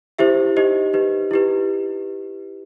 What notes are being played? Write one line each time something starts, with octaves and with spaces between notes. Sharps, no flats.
E4 G4 C5 E5
D#4 G4 C5 D#5
D#4 G4 B4
E4 G4 B4